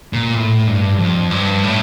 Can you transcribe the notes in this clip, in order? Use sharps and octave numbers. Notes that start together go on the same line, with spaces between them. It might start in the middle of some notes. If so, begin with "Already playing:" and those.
A#2
A2
G2
F2
G2
A2